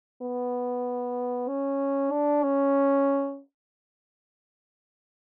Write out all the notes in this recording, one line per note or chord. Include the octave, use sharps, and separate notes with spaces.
B3
C#4
D4
C#4